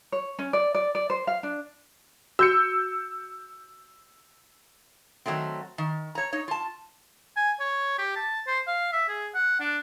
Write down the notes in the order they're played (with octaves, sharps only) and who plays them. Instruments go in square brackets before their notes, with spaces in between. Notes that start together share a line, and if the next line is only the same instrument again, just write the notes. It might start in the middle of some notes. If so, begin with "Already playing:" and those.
[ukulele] C#5
C#4
D5
D5
D5
C5
F5
D4
[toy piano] F#4 [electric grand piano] E6 G6 C#7
[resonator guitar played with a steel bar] D#3 E3 F#3 A3 C4
D#3
C#5 A#5
D#4 C#5
F4 A5
[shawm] G#5
C#5
G4
A5
C5
F5
E5
G#4
F#5
D4